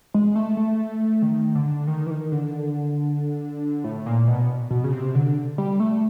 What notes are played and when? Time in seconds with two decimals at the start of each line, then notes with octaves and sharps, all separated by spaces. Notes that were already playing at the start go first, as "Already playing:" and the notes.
0.14 G#3
0.36 A3
0.57 A3
1.22 D#3
1.55 D3
1.87 D#3
2.06 E3
2.10 D#3
2.32 D3
3.84 A2
4.06 A#2
4.28 B2
4.71 B2
4.84 C#3
4.93 C3
5.15 D3
5.58 G3
5.80 A3